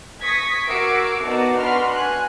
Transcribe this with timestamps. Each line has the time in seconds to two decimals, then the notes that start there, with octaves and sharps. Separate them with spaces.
0.23 C#6 D#6 G#6 A#6 B6
0.68 F#4 A#4 D6 E6 C7 D7
1.25 B3 D#4 F#4 D5 A5 A#5
1.60 D4 F#4 B4 B5 C6 F6
1.93 G#5 F#6